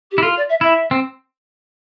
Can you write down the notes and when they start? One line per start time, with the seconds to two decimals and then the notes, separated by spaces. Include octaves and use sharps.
0.11 G4
0.18 E4
0.23 F4 A4
0.36 D5
0.49 E5
0.61 E4 E5
0.91 C4